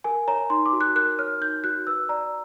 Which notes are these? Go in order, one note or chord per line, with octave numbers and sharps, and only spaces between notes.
A#4 G#5
C#5 A#5
D#4 C6
D6
F#4
F#6
A#4 F#6
C#5 F6
D#4 G6
F#4 F#6
B4 E6
D5 A#5